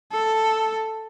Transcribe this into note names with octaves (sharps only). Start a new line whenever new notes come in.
A4